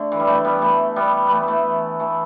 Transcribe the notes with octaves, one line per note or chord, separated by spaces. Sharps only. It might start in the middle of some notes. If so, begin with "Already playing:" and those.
Already playing: D3 A3
E3
G3
E3 A3
G3 B3
E3 A3
G3 B3
E3 A3 B3
E3 A3
E3 A3